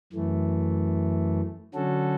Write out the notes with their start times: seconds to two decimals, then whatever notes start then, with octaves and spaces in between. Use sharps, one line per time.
0.13 F#2 E3 A3
1.74 D3 F#3 C#4 F#4 A4